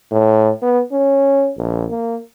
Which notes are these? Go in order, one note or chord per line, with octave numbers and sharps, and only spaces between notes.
A2
B3
C#4
A#1
A#3